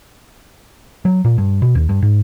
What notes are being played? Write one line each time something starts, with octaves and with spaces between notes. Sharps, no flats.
F#3
A#2
G2
B2
D#2
G2
G#2